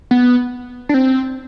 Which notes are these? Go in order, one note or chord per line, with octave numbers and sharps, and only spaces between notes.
B3
D4
C4